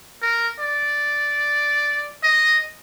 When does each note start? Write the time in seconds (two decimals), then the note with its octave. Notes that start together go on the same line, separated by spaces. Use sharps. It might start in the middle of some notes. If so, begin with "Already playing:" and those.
0.22 A#4
0.60 D5
2.23 D#5